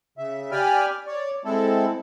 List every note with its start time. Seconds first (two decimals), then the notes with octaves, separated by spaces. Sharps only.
0.18 C#3 E5
0.51 G4 D5 G5 G#5 B5 F6
1.07 C#5 D5
1.45 G#3 C4 E4 A4